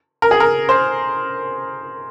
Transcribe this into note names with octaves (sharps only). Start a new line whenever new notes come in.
A#4
G#4
A#4
C5